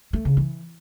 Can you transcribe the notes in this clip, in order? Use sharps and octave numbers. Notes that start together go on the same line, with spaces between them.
A3
C#3
E3